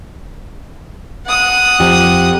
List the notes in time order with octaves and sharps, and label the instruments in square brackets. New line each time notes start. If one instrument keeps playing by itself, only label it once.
[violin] F#5 D#6
[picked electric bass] F2 F3 [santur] G4